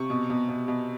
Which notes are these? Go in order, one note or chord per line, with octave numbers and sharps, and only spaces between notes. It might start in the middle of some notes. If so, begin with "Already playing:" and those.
Already playing: C3 C#6
B2
B2
B2
B2